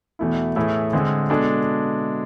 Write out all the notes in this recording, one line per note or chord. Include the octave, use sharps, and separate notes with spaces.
E2 B2 A3 E4
A2 E3 A3 E4 G#4
D3 G#3 C4 G#4
B2 G#3 D4 A4